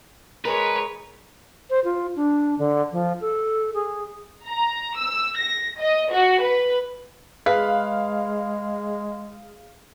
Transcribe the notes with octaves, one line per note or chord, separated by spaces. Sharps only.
G#3 A#4 B4 C#5
C5
F4
D4
D3
F3
A4
G#4
A#5
E6
A#6
D#5
F#4
B4
G#3 G#4 B4 F5